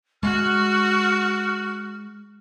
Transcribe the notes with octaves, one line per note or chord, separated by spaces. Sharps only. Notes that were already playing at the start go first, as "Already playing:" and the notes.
G#3 F#4 F6